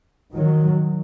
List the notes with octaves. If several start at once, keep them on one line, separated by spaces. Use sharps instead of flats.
D#3 F#3